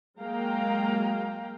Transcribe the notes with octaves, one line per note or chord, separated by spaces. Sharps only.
F#3 G#3 A#3 F5 G5 A#5